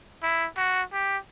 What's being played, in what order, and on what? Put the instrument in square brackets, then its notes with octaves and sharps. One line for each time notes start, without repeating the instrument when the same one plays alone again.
[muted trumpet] E4
F#4
G4